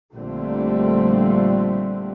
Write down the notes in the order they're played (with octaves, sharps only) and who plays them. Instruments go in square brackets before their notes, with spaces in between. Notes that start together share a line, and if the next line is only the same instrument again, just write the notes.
[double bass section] A#1 A#2 D3 G3 A3 C4